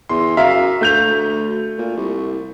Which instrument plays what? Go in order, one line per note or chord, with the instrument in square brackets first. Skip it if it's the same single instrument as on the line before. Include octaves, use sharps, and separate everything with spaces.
[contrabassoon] E2 [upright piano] C6
[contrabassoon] F#2 [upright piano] E5 F5 A#5
[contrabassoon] D2 [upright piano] A3 G6 F7
[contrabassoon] A#2
C2